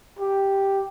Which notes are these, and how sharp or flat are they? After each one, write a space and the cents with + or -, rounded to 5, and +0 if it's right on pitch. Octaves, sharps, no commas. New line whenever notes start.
G4 +0